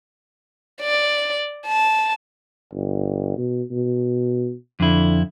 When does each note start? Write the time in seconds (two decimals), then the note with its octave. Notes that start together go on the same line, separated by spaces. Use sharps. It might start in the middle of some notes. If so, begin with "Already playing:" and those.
0.81 D5
1.66 A5
2.73 G1
3.37 B2
3.71 B2
4.80 F2 D3 E4